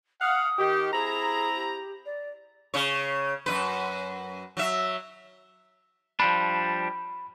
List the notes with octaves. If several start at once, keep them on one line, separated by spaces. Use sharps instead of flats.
F5 F#5 D#6
D#3 G4
C4 E4 G#4 A#5
G4
D5
C#3 C#5
F#2 C3 B4
F#3 E5
F3 G3 D4 B5